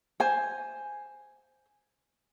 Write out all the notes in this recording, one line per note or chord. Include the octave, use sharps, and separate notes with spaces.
C5 G#5